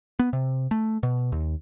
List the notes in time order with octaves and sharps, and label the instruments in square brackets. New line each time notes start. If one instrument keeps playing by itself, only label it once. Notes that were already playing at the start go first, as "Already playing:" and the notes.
[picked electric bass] B3
C3
A3
B2
D#2